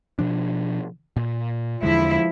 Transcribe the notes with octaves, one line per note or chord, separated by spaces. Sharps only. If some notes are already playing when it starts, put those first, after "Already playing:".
B2 F3 D4
A#2
E2 D3 F3 G#3 E4